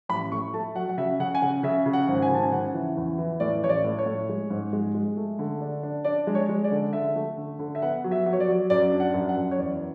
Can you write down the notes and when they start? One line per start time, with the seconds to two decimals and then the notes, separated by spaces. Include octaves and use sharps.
0.09 A1 B5
0.32 A2 C#6
0.54 A3 A5
0.75 F#3 F#5
0.89 F#5
0.98 C#3 E5
1.20 C#3 F#5
1.35 G#5
1.42 C#3 F#5
1.63 C#3 E5
1.86 C#3
1.93 F#5
2.08 G#1
2.15 F#5
2.22 G#5
2.29 C#3 A5
2.43 G#5
2.52 C#3 F#5
2.74 E3
2.97 E2
3.18 E3
3.40 A2 D5
3.63 A1 C#5
3.69 D5
3.84 A2
3.99 C#5
4.06 A2
4.29 G#3
4.50 G#2
4.73 G#3
4.94 G#3
5.17 A3
5.39 D3
5.61 D4
5.83 D4
6.05 D4 D5
6.27 G#3
6.35 C#5
6.49 G#3
6.64 D5
6.71 D3
6.93 D3 E5
7.16 A3
7.38 D3
7.59 D3
7.75 E5
7.82 B3 F#5
8.04 F#3
8.11 E5
8.26 F#3
8.33 C#5
8.40 D5
8.48 F#3
8.70 F#2 D5
8.92 D4
9.00 F#5
9.14 F#2
9.29 F#5
9.36 F#2
9.51 C#5
9.58 E2 D5